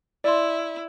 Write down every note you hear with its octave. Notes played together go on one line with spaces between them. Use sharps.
E4 D5 C6